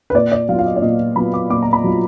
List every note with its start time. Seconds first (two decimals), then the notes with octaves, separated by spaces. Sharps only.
0.10 B4
0.15 A#2 D5
0.32 D5
0.49 F#3 B3 F4 F5
0.59 F5
0.66 D#5
0.76 D5
0.82 A#2 D#5
1.16 F#3 B3 F4 B5
1.34 D6
1.50 A#2 D6
1.62 A#5
1.73 B5
1.84 F#3 B3 F4